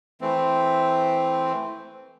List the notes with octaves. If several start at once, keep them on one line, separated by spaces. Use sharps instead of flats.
E3 A3 C4